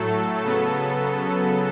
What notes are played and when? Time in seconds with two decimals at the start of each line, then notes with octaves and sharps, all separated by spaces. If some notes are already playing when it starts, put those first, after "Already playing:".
Already playing: A2 F#3 A3 A4
0.43 C#3 F#3 B3 A4